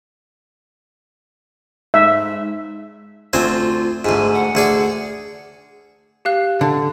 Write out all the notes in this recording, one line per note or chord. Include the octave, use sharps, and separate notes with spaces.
G#2 E5
D2 C4 F4 G#5
D2 G#2 G#5
F#5
D2 G#4 D5
G4 F5 F#6
D3